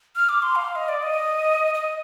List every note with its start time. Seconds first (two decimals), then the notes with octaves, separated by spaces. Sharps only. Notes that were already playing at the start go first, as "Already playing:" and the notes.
0.16 F6
0.29 D6
0.42 C6
0.55 F5
0.75 D#5
0.88 D5
1.02 D#5
1.74 D#5